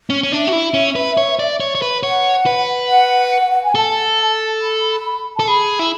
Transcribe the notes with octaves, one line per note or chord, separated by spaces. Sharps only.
C#4
C#4
D4 E5
F#4
E4
C#4
B4
C#5
D5
C#5
C#5
B4
C#5 F#5
B4
F#5
F#5
G#5
A4 A5
B5
A4 A5
G#4 B5
E4